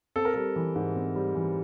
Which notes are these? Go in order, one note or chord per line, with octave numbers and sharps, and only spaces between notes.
C4 A4
A#4
G3 A4
E3
G#2
C4
G3
E3